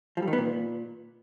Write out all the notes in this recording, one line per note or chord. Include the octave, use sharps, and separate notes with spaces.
F3
G3
D#3
B3
A#2